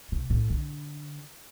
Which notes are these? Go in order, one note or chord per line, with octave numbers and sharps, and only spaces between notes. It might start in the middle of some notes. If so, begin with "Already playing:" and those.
C3
A2
D3